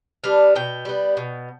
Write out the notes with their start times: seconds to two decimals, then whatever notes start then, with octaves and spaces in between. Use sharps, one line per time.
0.24 G3 B3 D4 F5
0.55 B2 G5
0.85 G3 B3
1.17 B2